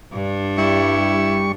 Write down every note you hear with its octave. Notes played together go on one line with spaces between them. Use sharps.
G2 D4
G3 E4 C#6